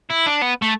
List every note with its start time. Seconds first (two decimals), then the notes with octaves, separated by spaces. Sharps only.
0.10 E4
0.27 D4
0.42 B3
0.62 A3